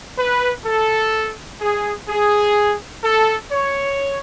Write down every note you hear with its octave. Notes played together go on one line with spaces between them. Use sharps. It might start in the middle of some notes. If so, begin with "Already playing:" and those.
B4
A4
G#4
G#4
A4
C#5